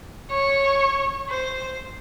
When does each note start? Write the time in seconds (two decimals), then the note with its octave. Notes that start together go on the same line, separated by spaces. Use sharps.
0.31 C#5
1.30 C5